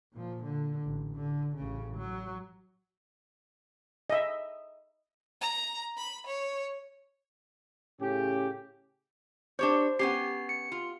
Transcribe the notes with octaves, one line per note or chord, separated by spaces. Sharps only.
A#2 F3
D3
A1
D3
A1 C#3
F#3
D#5 E5
A#5
B5
C#5
A2 C#3 C#4 G4
D4 G4 C5 C#5
B3 C#4 G4 C7
C#7
F4